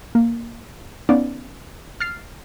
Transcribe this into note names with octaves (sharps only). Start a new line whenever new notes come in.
A#3
B3 C#4 D#4 D5 F5
F6 A6 C7